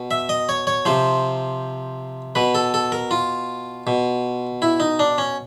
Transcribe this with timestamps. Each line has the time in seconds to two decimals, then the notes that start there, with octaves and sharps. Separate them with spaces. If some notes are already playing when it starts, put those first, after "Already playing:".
Already playing: B2
0.11 E5
0.29 D#5
0.49 C#5
0.67 C#5
0.85 C3 F3 C5
2.35 B2 B4
2.55 A4
2.74 A4
2.92 A#4
3.11 F4
3.87 B2
4.62 E4
4.80 D#4
4.99 D4
5.18 C#4